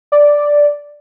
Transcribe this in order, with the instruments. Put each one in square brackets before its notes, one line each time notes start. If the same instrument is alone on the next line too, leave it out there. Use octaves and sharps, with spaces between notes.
[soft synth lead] D5